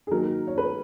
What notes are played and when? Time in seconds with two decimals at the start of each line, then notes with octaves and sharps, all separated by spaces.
0.07 G#4
0.11 D#3 F#3 A#3 A#4
0.47 C#5
0.58 B4